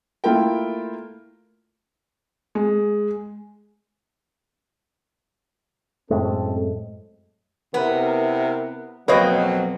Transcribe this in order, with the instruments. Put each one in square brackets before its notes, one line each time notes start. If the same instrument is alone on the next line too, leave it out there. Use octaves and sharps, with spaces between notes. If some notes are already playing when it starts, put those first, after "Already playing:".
[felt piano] A3 A#3 E4 F4 A#4 G5
G#3
[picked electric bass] F#2 A2 G#3 [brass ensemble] C4 A4
[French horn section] C3 E4 A#4 [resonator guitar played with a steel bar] B3
[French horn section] F2 B2 F#3 [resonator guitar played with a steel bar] A#3 C4 [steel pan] B4 C#5 D#5